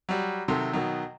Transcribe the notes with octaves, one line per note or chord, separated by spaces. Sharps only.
F#3 G3
C3 D#3 F#3 A4 E5 C6
B2 D#3 F#3